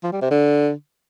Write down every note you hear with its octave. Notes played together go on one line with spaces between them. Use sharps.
F3
G3
C3
D3